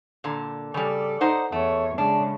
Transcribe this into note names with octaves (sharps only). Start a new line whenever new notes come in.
A#2 D3
C#3 G3 A4 D5
D#4 C5 F#5
E2 A3 C#5
C#3 G#3 D4